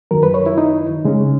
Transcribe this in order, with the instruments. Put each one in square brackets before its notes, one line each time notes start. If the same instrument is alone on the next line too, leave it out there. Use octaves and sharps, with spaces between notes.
[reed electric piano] F#2 D#3 F#3 A#4
B4
C#5
E4
D#4
C#3 G#3 C#4